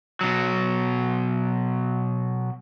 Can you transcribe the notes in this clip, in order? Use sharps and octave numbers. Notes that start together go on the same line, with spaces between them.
B2 F#3